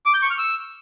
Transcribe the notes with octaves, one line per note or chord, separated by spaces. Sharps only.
D6
G6
C#6
F6
E6